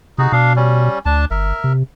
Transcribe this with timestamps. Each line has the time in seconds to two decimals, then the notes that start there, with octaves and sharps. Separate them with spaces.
0.18 C3 D#4 F#4 G#4
0.32 B2 D4 F5
0.56 G3 C#4
1.06 D2 D4 A5
1.31 G1 A#4 E5
1.64 C3